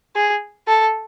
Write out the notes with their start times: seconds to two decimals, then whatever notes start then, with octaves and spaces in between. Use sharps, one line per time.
0.16 G#4
0.68 A4